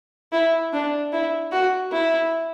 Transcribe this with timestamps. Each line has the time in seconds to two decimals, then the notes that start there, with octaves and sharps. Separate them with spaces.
0.32 E4
0.73 D4
1.12 E4
1.52 F#4
1.92 E4